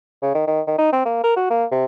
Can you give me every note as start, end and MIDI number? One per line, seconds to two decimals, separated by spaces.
0.22 0.33 49
0.35 0.43 51
0.47 0.61 51
0.67 0.77 51
0.79 0.91 63
0.93 1.05 60
1.05 1.19 58
1.24 1.36 70
1.36 1.48 66
1.50 1.65 58
1.72 1.85 48